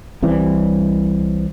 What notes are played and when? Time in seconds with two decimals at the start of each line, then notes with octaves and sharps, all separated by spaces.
0.22 C2 C3 E3 G3